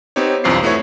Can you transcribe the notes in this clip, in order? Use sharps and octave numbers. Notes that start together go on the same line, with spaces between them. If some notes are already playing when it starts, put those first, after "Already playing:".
B3 C4 D#4 G4 C#5
B1 E2 G2 C4 F4 C7
A3 B3 E4 F#4 C#5